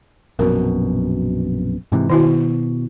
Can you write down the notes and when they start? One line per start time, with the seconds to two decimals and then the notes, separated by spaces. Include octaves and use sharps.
0.39 A#1 F#2 B2 A#4
1.92 G#2 C3 E3
2.10 B2 D#3 E4 F#4